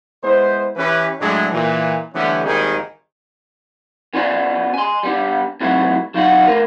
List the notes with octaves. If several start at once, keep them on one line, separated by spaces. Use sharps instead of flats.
G#3 B3 E4 C5
E3 C#4 G4 B4
A2 F#3 G#3 D4
A#2 E3
D3 E3 G3 A3 B3 C#4
G#1 D#3 G3 A#3 D#4 G#4
B3 C#4 F4 F#4 D5
G#5 C6
G3 B3 D4
G#2 C3 F#3 A3 E4 F#4
F#3 D#4 F4 F#4 F#5
A3 A#4 B4